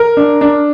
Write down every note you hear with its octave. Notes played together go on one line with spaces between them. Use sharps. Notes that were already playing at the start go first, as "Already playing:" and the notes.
Already playing: A#4
D4
D4